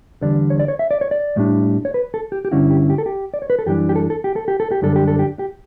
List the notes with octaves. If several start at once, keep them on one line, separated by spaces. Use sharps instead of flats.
E2 D3 G3 D5
C#5
D5
C#5
E5
D5
C#5
D5
A2 G3 D4
C#5
B4
A4
G4
G4
G2 D3 G3 C#4 E4 F#4
G4
G4
A4
G4
D5
C#5
B4
A4
F#2 E3 G3 D4 G4
G4
A4
A4
G4
A4
G4
A4
G4
F#2 D3 G3 D4 A4
G4
A4
G4
G4